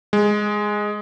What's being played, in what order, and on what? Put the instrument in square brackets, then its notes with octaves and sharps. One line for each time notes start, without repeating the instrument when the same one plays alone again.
[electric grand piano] G#3